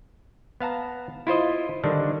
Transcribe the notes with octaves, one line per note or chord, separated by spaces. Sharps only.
B3 F5 A5 A#5
E4 F4 C5 D#5
D3 D#3 G3 D4